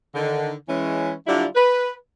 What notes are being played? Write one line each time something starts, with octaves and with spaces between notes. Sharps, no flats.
D3 D#3
E3 G#3 C#4
D3 F#3 G3 D4 E4 F4
B4